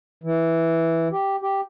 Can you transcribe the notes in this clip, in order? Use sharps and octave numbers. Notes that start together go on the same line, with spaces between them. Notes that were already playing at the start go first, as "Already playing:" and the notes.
E3
G4
G4